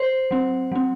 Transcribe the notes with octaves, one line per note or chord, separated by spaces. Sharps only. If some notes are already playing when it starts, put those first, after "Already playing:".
Already playing: C5
F#3 C4
F#3 C4